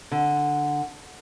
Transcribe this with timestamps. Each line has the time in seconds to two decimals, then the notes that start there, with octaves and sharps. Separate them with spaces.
0.12 D3